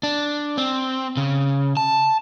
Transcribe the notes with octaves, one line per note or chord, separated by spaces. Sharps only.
D4
C4
C#3
A5